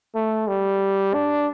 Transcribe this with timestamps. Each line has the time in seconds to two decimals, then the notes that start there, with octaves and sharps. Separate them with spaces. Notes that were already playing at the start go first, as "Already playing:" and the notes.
0.15 A3
0.48 G3
1.14 D4